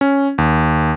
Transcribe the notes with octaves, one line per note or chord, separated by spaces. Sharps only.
C#4
D#2